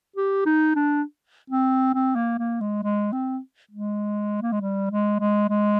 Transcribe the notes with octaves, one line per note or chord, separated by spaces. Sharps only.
G4
D#4
D4
C4
C4
A#3
A#3
G#3
G#3
C4
G#3
A#3
G#3
G3
G#3
G#3
G#3